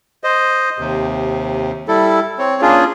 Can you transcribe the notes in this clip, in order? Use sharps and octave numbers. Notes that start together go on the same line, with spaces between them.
C5 D#5
D#2 C3
G3 E4 A4
C4 C#5
A#3 C#4 D4 F4 G#4